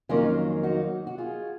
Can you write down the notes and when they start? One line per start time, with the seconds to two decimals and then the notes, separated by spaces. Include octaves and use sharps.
0.09 F2 D#3 F#3 A#3 C#4 F4
0.63 D#4 F#4
1.07 F#4
1.18 F4 G#4